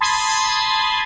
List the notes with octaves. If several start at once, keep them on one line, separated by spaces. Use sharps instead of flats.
A5 B5 C6 D#6 G#6